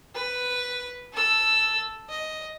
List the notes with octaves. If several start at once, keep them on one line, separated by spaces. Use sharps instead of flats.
B4
A4 E6
D#5